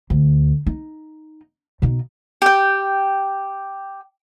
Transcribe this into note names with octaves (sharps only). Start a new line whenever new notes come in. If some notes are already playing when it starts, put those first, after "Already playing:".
D2
D#4
B2 D#4
G4 G5